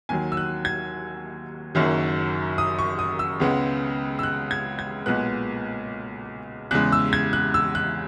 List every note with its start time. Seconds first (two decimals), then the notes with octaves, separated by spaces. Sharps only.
0.09 D#2 D#3 F#3 G#5
0.32 E6
0.37 F#6
0.65 G#6
1.75 F#1 F#2 D#3 F#3
2.58 D#6
2.79 C#6
2.99 D#6
3.19 E6
3.40 C#2 C#3 G#3 B3
4.19 E6
4.23 F#6
4.51 G#6
4.79 G#6
5.06 B1 A#2 G#3 B3 F#6
6.71 E2 C#3 G#3 F#6
6.92 E6
7.13 G#6
7.33 F#6
7.54 E6
7.75 F#6